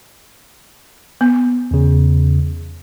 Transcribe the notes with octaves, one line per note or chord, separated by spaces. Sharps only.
B3
E2 C#3